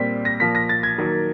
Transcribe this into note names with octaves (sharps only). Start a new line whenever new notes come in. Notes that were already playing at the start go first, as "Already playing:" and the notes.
Already playing: A#2 G3 C4 B6
A#6
A#2 F3 A#3 B6
A#6
A6
G#6
D#3 F#3 A#3